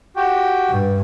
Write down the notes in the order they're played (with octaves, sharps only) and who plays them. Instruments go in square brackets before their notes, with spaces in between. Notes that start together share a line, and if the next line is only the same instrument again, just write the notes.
[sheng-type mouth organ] F#4 G4 G5
[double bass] G2